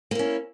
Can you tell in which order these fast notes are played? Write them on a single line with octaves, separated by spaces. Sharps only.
A#3 E4 C#4